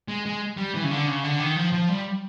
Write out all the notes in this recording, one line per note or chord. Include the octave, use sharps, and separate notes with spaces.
G#3
G#3
G3
E3
C#3
D3
C#3
D3
D#3
F3
F3
G3